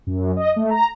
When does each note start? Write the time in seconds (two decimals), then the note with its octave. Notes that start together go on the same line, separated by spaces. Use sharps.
0.07 F#2
0.37 D#5
0.56 A3
0.70 A#5